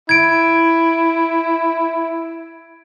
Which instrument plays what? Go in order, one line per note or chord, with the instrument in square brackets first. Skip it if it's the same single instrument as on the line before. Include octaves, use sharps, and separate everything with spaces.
[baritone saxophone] E4 [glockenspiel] G#6 D7